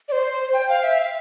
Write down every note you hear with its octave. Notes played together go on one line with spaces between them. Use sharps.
D5
C5
G5
F5
E5
F5